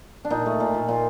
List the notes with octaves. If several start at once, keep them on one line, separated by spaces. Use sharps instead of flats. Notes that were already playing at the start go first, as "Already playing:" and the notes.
D4
A#2 D#4
A3
A#2
A#2
A#2 F4